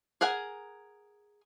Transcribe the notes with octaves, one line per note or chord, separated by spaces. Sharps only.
G#4 A#4 F#5 G#5